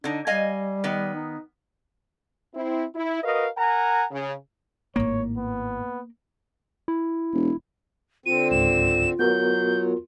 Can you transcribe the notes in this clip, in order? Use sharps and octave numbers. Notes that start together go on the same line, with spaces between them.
D3 D4 D#4
G3 D#5 F5 G#5
D#3 B3
D#4
C4 E4
E4
F#4 A#4 B4 D#5 F5
A#4 F#5 G#5 A#5
C#3
G#1 A2 A#3 C#5
B3
E4
E1
D3 C4 F4 D#7
C#2 G#2 E7
F#3 B3 F#4 A#4 G6